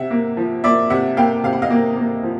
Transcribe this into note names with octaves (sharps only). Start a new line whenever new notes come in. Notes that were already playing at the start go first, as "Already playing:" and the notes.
Already playing: C3 E5 F#5
A#3
F3
A#3 D5 E5
C3 E5 F#5
A#3 F5 G5
C3 F5
F#5
D#5 F5
A#3
A#3
F3